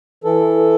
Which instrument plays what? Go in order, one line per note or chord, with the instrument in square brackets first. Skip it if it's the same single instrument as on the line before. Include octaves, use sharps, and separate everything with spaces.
[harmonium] E3 A4